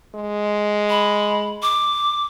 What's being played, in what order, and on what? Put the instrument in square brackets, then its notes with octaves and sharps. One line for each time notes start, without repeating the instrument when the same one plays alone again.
[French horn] G#3
[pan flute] B5
D6